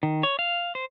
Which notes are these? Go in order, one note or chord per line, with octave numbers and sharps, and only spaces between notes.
D#3
C#5
F5
C5